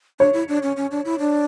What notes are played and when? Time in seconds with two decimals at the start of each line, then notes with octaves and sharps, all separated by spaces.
0.20 D4 C#5
0.33 E4
0.48 D4
0.63 C#4
0.76 C#4
0.91 D4
1.05 E4
1.19 D4